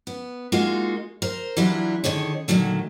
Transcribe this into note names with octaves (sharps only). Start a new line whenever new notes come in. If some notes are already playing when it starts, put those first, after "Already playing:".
B3
G#3 A#3 D#4 F4 F#4
A#4 C5
E3 F#3 G3 D4 E4 F4
D3 D#3 G#4 C#5
A#2 D3 D#3 F#3 A3